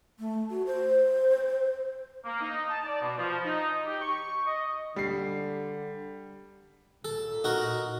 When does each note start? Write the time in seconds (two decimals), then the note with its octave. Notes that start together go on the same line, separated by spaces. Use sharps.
0.19 A3
0.50 F#4
0.66 C5
2.25 A#3
2.42 D#4
2.70 A5
2.85 D5
3.01 B2
3.18 F3
3.45 D#4
3.85 G4
4.02 C#6
4.47 D#5
4.96 D3 G3 C7
7.05 A#2 A4
7.44 D#4 F#4 A#4